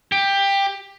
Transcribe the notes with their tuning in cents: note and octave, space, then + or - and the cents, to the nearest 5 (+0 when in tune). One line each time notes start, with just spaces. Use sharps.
G4 +15